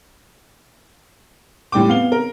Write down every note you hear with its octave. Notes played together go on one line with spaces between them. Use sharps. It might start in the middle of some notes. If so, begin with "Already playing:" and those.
A2 G3 G5 D6
B3 F5 G7
A#4